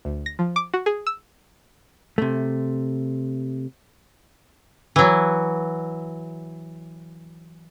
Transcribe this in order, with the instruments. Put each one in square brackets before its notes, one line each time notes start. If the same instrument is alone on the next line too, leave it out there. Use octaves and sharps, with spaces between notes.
[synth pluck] D2
A#6
F3
D6
F#4
G#4
E6
[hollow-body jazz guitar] C3 A3
[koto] E3 F#3